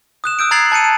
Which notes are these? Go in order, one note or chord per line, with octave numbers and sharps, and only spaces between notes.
D#6 F#6 E7
D#6 E6 G6 D7
A#5 F#6 G#6 A6 C7 F#7
A5 G6 C#7 D#7
D#7